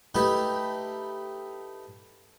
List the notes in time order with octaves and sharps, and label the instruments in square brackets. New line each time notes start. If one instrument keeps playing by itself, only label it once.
[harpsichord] A3 D#4 E4 G4 B4